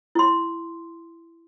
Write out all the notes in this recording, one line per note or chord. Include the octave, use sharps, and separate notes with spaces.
E4 C6